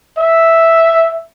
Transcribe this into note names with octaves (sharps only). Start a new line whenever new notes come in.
E5